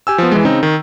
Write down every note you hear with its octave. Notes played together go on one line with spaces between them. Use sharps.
G4 G#5 E6
F3 B3
E3 G#3
C#3 C4 D#4
D#3